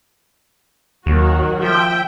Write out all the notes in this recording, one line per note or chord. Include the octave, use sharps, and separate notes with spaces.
D#2 D#3 F#3 F#4
F3 E5 G5